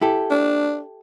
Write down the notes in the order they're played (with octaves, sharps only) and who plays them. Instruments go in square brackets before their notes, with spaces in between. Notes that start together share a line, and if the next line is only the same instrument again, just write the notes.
[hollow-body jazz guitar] E4 G4 A4
[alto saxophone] D4